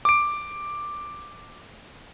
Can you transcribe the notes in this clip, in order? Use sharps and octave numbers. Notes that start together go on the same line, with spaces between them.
D6 D7